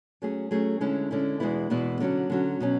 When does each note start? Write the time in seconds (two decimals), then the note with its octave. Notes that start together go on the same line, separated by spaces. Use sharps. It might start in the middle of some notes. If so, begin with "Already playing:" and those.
0.22 F#3 A3 C#4 G#4
0.51 F#3 A3 C#4 G#4
0.81 D3 G#3 C#4 E4
1.11 D3 G#3 C#4 E4
1.40 E2 B2 G#3 B3 E4
1.70 E2 B2 G#3 B3 E4
2.00 D3 F#3 C#4 F#4
2.30 D3 F#3 C#4 F#4
2.60 B2 F#3 C#4